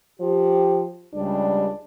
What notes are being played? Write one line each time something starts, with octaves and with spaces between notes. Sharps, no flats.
F3 G4
C#2 G3 D4